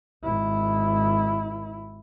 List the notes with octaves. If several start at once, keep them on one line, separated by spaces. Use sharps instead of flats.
G#1 E4